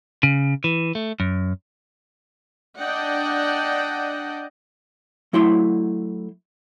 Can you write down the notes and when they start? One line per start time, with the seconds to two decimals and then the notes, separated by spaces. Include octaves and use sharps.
0.23 C#3
0.64 E3
0.95 A3
1.20 F#2
2.78 D4 D5 D#5 F#5 G5
5.33 F#3 A3 E4 E5 C6